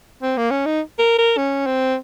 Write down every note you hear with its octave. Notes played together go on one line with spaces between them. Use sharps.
C4
A#3
C#4
D#4
A#4
A#4
C#4
C4